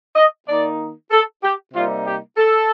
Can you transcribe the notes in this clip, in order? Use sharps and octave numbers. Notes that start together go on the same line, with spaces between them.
D#5
D#3 A#3 D#4 D5
A4
G4
C3 G3 A#3 D#4 F4
G4
A4